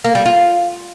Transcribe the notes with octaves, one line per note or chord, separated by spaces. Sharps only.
A#3
G3
F4